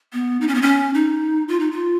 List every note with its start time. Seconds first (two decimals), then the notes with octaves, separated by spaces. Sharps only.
0.13 B3
0.41 D#4
0.48 C#4
0.55 B3
0.62 C#4
0.94 D#4
1.48 F4
1.60 D#4
1.71 F4